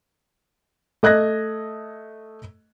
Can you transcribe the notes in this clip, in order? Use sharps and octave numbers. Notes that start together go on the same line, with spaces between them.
A3 D#5 F#6 G#6 A#6